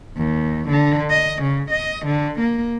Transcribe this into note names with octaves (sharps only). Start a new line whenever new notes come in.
D#2
D3
D#5
C#3
D#5
D3
A#3